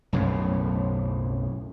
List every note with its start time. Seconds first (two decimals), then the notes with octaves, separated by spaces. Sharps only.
0.13 B1 F#2 A2 C#3